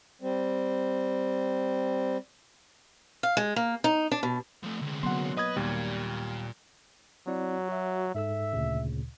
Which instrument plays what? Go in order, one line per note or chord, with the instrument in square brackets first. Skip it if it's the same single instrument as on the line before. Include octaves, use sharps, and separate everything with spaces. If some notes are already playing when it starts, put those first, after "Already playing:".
[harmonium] G3 C4
[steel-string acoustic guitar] F5
G#3
A#3
D#4
D4
B2
[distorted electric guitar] F3 A3
D2 G#3
[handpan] F#3 A#3 B3 [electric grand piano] F#5 C6
[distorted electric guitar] B4 [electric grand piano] D#5 D#6 G#6
[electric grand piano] D#2 G3 [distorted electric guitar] A#2
[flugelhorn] F#3 [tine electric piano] C4 E4 D5
[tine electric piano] F#4 E5
[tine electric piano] G#2 A4 E6 [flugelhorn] E5
[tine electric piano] D2 A#2 C#3